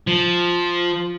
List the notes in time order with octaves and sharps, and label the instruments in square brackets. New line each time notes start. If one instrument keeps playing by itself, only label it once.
[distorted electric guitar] F3